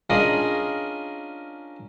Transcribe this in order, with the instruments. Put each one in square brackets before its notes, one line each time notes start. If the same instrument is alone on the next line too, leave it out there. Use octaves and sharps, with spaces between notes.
[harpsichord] C#4 D4 F4 G#4 A#4 D#5